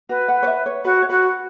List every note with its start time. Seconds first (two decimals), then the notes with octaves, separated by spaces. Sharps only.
0.09 F#4 B4
0.28 F#5
0.43 C#5
0.47 E5
0.66 C#5
0.84 F#4 B4
1.02 C#5
1.09 F#4 B4